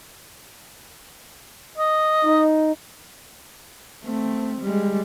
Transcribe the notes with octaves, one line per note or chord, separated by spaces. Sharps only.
D#5
D#4
A3 C4
G3 G#3